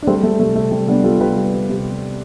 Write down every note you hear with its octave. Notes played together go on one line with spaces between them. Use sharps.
D4
G3 A3 C4
G3 A3
C3 A3
C3 A3
C3 G3
G3 B3 D4
G3 F4 A4
C3 G4 B4
G3
G3
C3